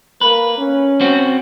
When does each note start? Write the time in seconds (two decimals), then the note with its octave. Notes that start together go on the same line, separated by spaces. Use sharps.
0.21 A#3 B4
0.58 C#4
1.01 C4 F#4